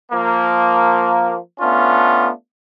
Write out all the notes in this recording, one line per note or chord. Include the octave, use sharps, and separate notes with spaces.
F3 A#3
A3 B3 C#4 D4 F4